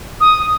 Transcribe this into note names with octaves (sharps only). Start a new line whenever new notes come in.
D#6